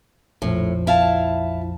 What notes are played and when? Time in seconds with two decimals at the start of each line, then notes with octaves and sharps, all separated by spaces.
0.42 A#1 F2 A2 F3
0.87 E4 F5 A5